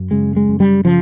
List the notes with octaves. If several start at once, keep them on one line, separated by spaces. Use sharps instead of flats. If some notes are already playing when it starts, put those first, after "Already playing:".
Already playing: F#2
C#3 G#3
G#3
F#2
G3
C#3 F3